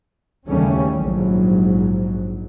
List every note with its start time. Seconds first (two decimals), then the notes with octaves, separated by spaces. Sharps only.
0.48 D#2 C#3 E3 G3 A3 C#4
0.93 A#1 G#2 F#3